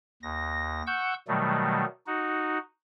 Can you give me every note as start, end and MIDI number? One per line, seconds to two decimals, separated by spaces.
0.23 0.82 39
0.23 0.82 94
0.87 1.14 78
0.87 1.14 85
0.87 1.14 88
0.87 1.14 91
1.28 1.85 47
1.28 1.85 51
1.28 1.85 54
1.28 1.85 55
1.28 1.85 57
2.07 2.58 63
2.07 2.58 66